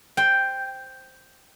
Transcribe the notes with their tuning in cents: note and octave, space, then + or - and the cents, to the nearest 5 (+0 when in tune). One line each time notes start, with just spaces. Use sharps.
C5 +0 G5 +0